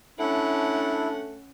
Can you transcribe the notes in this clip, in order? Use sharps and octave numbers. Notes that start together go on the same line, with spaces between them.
A3 C#4 D4 E4 F#5